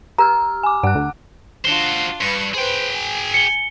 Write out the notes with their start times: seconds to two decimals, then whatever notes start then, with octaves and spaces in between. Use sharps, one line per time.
0.18 G4 A#5 E6 F6
0.63 G#5 D6
0.83 G2 F#5 F#6
0.95 D2
1.65 D4 F4 F#4 C5 G7
2.21 G2 B4 C#6
2.54 G#4 B4 C5 G5
2.91 G#5
3.34 C#7 G7